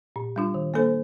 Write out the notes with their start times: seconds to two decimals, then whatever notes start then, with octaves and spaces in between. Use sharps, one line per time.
0.16 A#2
0.36 G3 D4 F4
0.54 D#3
0.74 A#3 D4 A4 C5